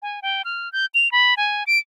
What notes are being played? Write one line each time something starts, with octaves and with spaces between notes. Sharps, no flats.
G#5
G5
F6
G6
F7
B5
G#5
D7